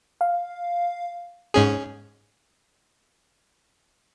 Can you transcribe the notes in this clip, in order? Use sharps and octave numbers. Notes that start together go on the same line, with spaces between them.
F5
G#2 C#4 G#4